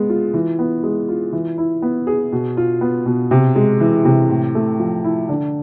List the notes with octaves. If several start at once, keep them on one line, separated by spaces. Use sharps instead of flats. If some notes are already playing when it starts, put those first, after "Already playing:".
Already playing: G#3 B3
F4
E3
B3
G#3
F4
E3
E4
B3
G#4
B2
F4
B3
B2
C3
G#3
E3
C3
A2
A3
F3
E4
D3